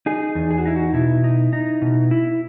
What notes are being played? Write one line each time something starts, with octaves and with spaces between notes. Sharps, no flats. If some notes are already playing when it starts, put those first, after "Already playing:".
D#4 G#4
E2
G#4
F#4
D#4 E4
F#4
B2 E4
D#4
D#4
B2
E4